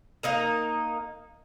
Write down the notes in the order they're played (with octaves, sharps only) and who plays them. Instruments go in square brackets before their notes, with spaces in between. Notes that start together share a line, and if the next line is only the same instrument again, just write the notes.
[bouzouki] A#3 D#4 A#4